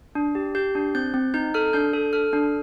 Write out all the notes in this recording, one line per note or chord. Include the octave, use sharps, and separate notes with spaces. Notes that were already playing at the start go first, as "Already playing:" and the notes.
D4
G4
G4 G6
D4
C4 G6
C4
D#4 G6
A4 F6
D4 G6
A4
A4 F6
D4